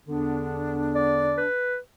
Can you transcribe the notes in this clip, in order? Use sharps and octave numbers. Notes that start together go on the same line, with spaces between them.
E2 D3 B3 D4
D5
B4